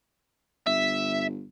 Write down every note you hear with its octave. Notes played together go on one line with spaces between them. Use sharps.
G1 E5